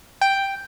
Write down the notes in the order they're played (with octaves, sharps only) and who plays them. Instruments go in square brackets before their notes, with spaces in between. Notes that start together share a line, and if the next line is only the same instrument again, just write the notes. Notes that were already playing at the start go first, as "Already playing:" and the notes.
[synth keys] G5